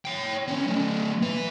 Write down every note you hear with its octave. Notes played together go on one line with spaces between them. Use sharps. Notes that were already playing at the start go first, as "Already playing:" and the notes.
C#5 G5
B3 C#4
F#3 A3
E4 B4